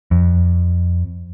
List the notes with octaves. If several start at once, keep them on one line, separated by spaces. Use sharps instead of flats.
F2